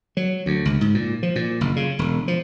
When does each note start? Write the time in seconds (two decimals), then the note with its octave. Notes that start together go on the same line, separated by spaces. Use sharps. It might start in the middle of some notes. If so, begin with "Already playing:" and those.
0.17 F#3
0.46 D2
0.65 C#2
0.81 G#2
0.94 A#2
1.23 F3
1.36 A#2
1.61 F#1
1.76 C#3
1.99 E1
2.28 F3